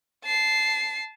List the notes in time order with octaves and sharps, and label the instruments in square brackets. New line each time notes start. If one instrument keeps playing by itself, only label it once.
[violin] A5 C7